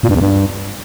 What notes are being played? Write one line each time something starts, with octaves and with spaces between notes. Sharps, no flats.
A#2
G2
E2
G2